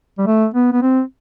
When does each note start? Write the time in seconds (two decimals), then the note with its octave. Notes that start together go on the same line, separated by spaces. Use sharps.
0.18 G3
0.27 A3
0.54 B3
0.72 B3
0.82 C4